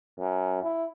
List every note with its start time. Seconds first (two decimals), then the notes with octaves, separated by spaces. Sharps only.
0.19 F#2
0.63 E4